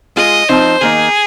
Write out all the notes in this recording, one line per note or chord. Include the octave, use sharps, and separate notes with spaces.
G#3 F4 G#4 D#5
F3 C4 D#4 C5
D#3 A#3 D#4 G#4